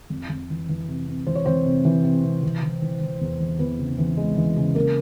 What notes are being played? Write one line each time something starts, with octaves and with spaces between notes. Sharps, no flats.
F2
F2
E3
E3
C3
C3
E3 C5
C#5
E3 C4 C5
C3
E3
C3
C3
E3
E3
E3
E3
E2
E3
E3 B3 B4
C#3
E3
G#3
E3
C#3
A#3 A#4